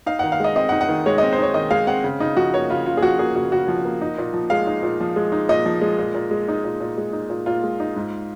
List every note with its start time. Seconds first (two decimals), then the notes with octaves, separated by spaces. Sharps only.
0.06 D#4 F5
0.19 F#5
0.24 D#3
0.32 F5
0.40 G#3 D#5
0.56 C4 D#5
0.69 F#5
0.72 D#4
0.81 F#5
0.89 D#3
1.06 G#3 C#5
1.18 D#5
1.22 C4
1.33 C5
1.38 D#4 C#5
1.54 D#3 D#5
1.71 G#3 F5
1.87 C4 F#5
2.04 C#3
2.20 C#3 D#4
2.36 F3 F#4
2.54 A#3 C#5
2.70 C#3 F4
2.86 C#3 F4
2.97 G#4
3.02 F3 F#4
3.19 A#3 G#4
3.35 C#3 F#4
3.52 C#3 F#4
3.68 F3
3.85 A#3
4.01 D#4
4.18 A#2
4.34 F3
4.50 G#3 F5
4.67 D#4
4.83 A#2
5.00 F3
5.16 G#3
5.32 D#4
5.49 A#2 D#5
5.66 F3
5.81 G#3
5.98 A#2
6.14 A#2
6.31 G#3
6.48 D#4
6.64 A#2
6.80 A#2
6.98 G#3
7.13 D#4
7.30 A#2
7.46 A#2 F4
7.63 G#3
7.80 D#4
7.96 G#2